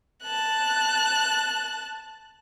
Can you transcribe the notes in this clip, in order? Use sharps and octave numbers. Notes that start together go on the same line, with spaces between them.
A5 F#6